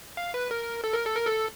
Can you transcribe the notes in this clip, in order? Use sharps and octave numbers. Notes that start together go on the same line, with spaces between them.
F5
B4
A#4
A4
A#4
A4
A#4
A4